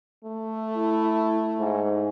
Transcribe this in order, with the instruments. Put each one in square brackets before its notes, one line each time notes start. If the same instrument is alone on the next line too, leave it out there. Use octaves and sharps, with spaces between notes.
[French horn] A3
[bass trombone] E4
G#2